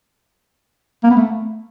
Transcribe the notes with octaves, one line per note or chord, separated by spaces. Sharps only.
A#3
B3
A3